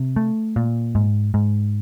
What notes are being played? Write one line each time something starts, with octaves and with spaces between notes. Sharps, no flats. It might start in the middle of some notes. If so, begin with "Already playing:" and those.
Already playing: C3
A3
A#2
G#2
G#2